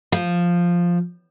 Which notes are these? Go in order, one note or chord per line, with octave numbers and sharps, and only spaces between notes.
F3